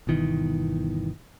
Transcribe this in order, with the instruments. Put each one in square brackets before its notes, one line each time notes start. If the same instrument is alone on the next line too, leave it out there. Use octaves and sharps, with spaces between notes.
[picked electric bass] G1 B2 D#3 E3